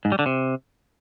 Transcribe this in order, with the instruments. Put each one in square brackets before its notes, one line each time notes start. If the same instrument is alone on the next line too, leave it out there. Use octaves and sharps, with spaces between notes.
[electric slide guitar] G#2
G3
D3
C3